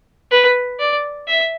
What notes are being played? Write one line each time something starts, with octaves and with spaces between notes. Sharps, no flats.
B4
D5
E5